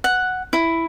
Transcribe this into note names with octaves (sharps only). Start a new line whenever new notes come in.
F#5
E4